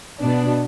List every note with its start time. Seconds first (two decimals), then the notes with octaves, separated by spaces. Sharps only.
0.21 B2 B3 D4